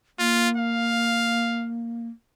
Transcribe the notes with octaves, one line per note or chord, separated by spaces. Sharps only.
A#3 F4
F5